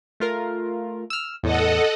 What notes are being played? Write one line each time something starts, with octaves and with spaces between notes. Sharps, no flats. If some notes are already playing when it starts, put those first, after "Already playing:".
A3 F4 A#4
E6 F6
E2 A2 A4 D#5 F#5